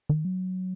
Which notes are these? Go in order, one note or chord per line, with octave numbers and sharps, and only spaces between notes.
D#3
F#3